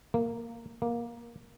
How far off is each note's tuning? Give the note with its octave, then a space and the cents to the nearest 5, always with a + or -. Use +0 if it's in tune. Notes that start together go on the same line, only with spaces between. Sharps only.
A#3 -10
A#3 +15